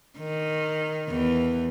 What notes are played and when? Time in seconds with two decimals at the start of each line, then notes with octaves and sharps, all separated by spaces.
0.18 D#3
1.10 E2 E3